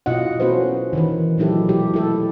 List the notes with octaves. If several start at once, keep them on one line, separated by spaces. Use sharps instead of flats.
B2 E4 F4 D#5 F#5
B3 C#4 F#4 A4 B4 C5
D#3 E3 B4
A#2 F#3 D#4 E4 G4 A4
B2 G#3 G4
E4 A4